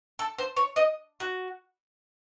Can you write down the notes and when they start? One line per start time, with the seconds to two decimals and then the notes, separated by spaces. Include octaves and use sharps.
0.19 A4
0.38 C5
0.57 C#5
0.76 D#5
1.20 F#4